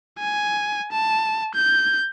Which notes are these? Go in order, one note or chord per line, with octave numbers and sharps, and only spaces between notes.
G#5
A5
G6